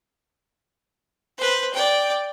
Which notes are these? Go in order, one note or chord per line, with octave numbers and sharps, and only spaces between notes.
B4 C5
D5 G5